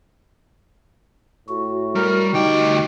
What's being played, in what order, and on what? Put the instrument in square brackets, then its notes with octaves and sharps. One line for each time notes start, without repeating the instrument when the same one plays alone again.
[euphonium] A2 [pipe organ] F#4
[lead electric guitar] G3 [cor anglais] A#4
[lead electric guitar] D2 G5 [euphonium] D#4 [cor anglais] G4